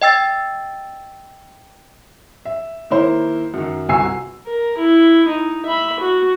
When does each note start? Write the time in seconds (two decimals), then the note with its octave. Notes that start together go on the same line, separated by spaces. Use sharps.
0.02 D#5 G5 E6 A6
2.45 E5
2.90 D#3 A#3 E4 C5
3.54 F#2 D#3
3.88 G1 C2 F#4 G#5 E6 C7
4.47 A#4
4.78 E4
5.28 D#4
5.66 E5 B5
6.00 F#4